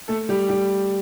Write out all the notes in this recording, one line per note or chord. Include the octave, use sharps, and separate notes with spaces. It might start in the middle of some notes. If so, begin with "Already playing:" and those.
A3 A4
G3 G4
G3 G4